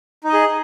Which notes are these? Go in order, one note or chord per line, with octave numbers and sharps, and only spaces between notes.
D#4 G#4 D#5